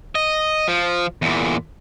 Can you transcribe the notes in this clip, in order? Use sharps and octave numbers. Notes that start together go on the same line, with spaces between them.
D#5
F3
E2 A#2